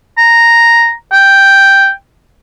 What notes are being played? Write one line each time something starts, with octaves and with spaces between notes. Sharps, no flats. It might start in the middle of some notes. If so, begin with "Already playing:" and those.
A#5
G5